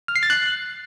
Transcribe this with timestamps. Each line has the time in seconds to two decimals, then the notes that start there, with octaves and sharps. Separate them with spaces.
0.08 F6
0.16 C7
0.23 A6
0.30 F#6